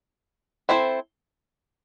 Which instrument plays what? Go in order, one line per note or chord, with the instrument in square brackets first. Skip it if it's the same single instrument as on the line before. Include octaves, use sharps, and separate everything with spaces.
[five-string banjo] C4 E4 A4 C5